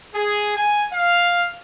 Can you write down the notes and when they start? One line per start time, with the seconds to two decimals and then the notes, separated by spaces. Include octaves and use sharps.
0.14 G#4
0.57 G#5
0.92 F5